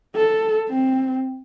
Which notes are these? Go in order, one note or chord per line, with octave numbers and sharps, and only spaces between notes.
A4
C4